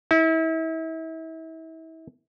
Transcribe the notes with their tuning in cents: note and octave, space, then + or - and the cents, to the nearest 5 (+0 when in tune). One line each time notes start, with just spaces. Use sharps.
E4 -35